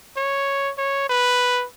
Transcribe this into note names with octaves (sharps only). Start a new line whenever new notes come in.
C#5
C#5
B4